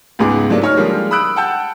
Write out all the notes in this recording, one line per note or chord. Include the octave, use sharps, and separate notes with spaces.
C#2 G#2 B3 G#4 D6
G2 F#3 A3 A#3 D4 E4
D#4 C#5 F6
D3 F3 G3 G#3 A#3
B5 D#6 E6 F#6 D7
F#5 G5 A5 E6 G6